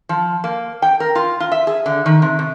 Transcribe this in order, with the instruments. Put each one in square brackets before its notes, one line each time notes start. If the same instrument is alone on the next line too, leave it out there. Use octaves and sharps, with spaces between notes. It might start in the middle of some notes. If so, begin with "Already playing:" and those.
[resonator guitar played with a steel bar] F3
A#3
G5
A#4
F4
F4
E5
G#4
D3
D#3
C3
C3